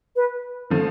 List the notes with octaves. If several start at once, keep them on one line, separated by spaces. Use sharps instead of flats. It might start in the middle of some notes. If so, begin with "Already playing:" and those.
B4
D3 F3 A3